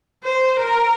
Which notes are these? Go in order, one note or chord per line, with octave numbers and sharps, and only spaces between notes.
C5
A#4